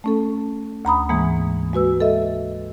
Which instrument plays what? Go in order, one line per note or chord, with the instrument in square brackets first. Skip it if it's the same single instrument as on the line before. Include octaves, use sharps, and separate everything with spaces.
[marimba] A3 C#4 A4
D2 A#5 B5 D#6
G#2 E3 G#3 A#3
G#3 F#4 B4 E6
A4 D#5 E5